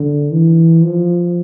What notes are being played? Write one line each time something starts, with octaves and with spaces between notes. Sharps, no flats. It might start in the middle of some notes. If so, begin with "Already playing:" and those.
Already playing: D3
E3
F3